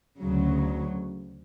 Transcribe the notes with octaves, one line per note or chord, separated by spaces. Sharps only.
D2 C#3 F#3